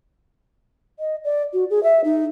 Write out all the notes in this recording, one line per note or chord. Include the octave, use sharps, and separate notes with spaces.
D#5
D5
F#4
G#4
E5
D#4